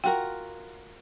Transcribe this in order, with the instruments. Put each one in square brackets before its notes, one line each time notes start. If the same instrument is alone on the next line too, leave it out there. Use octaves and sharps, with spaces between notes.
[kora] F4 F#4 A#4 [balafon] G5